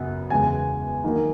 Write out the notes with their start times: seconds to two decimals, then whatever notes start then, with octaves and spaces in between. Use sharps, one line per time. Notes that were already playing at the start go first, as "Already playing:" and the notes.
Already playing: F#2 C#3 B3
0.30 E2 C#3 G#3 G#5
1.04 D#3 F#3 A#3 D#4